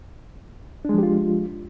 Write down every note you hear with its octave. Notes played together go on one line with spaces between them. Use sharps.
F3 G#3 D4 F4 G4